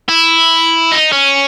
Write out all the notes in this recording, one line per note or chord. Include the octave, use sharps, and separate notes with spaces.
E4
D#4
C#4